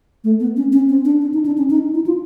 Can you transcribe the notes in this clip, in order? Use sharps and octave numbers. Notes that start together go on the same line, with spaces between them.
A3
B3
C#4
C#4
C4
D4
D4
D#4
D4
C#4
D#4
E4
F4